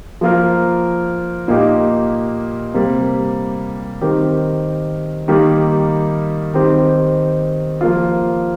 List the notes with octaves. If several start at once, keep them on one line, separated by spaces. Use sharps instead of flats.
F3 A#3 F4 A#4
A#2 A#3 D#4 G4
C3 G3 A#3
D#3 C4 G4 A#4
D#3 G3 A#3 G4
D#3 C4 G4
F3 A#3 F4